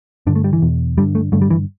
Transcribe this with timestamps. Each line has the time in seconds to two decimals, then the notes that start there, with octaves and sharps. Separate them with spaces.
0.27 G2 D3 D4
0.35 A3
0.44 G3
0.53 E3
0.62 E2 B2
0.98 G2 D3 G3
1.15 A3
1.32 G2 D3 A3
1.41 G3
1.50 E3